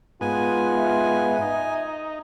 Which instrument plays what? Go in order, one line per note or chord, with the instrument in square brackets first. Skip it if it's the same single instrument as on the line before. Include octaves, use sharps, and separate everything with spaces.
[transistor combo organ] G#2 B3 [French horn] F4 [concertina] G#5
[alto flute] E5
[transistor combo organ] D#4